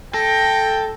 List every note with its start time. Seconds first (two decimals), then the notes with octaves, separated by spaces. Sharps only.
0.14 A4 G5 A#6